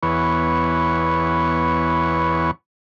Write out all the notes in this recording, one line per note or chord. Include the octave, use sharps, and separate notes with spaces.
E2 B3 C#5